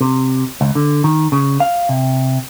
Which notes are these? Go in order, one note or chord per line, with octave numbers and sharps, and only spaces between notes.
C3
C#2
D3
D#3
C#3
F5
C3